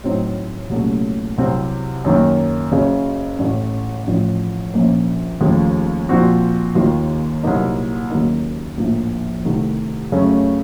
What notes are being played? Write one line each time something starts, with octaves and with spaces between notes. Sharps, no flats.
A2 F#3 C4 D#4
C2 A#2 F#3 A3 C#4
C2 C3 F#3 C4
F#2 D#3 A#3
F#1 F#2 C#3
A1 A2 A3
A1 A2 F3
A#1 A#2 F3 A#3 C#4
D#2 C#3 F3 A3
A#2 F3 C4 F#4
D#2 D#3 A#3 F4
C2 A#2 F#3 A#3 D#4
D#2 C#3 F#3 A#3 D#4
A#1 A2 F3 A#3
C2 C3 D#3 A3
F#2 C#3 A3 C#4